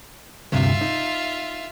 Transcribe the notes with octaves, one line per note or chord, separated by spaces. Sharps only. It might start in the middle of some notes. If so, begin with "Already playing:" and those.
D2 G2 C3 F4 E5
D#4